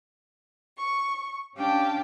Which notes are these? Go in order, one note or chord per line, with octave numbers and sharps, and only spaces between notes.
C#6
C#4 D4 G4 F5 G5 A5